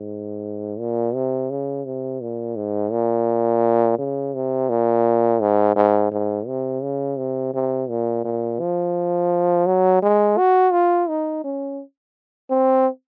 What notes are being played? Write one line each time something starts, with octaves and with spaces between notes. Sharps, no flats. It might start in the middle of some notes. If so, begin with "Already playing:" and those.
Already playing: G#2
A#2
C3
C#3
C3
A#2
G#2
A#2
C#3
C3
A#2
G#2
G#2
G#2
C3
C#3
C3
C3
A#2
A#2
F3
F#3
G#3
F#4
F4
D#4
C#4
C4